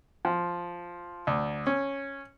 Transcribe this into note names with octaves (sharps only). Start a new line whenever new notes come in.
F3
D2
C#4